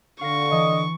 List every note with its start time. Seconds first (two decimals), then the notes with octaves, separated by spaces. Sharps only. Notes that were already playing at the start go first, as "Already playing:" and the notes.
0.21 D3 F5 C#6 A#6
0.52 E3 D#5